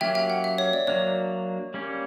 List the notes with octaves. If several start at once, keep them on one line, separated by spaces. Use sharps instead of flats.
F#3 A#3 C#4 G4 E5 G5
E5 G5
F#5
E5
C#5
D5
F#3 A#3 D4 C#5
G3 A#3 C#4